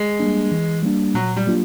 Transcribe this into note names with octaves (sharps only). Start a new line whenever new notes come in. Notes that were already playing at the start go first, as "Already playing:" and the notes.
Already playing: G#3
G3 A#3 D4
E3
G3 A#3 D4
A#2 F#3
G3
F#3 A#3 D4 F4